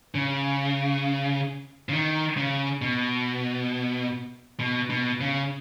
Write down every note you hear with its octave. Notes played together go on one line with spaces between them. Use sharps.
C#3
C#3
D#3
C#3
B2
B2
B2
C#3